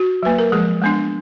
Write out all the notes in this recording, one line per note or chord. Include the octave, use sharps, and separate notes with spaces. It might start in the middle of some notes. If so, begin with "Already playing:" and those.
Already playing: F#4
F#3 A#3 B4
A#4
F3 G#3 G#4
G#3 B3 D4